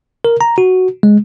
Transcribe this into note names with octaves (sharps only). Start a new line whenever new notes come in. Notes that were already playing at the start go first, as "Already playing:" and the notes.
A#4
A#5
F#4
G#3